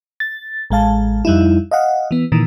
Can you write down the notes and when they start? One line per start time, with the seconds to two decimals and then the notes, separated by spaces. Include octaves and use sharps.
0.20 A6
0.70 A1 G#3 F5 A5
1.25 F2 G3 D#4 E4
1.71 D#5 F5 F#5
2.11 E3 B3
2.32 A#2 D#3 E3